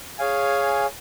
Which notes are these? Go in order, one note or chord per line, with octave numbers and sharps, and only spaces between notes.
G#4 C#5 F5 G#5